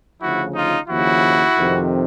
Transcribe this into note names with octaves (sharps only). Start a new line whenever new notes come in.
D2 C#3 F3 E4 F#4
D#4 F4
D#2 C#3 F3 E4 F#4
F2 C3 D#3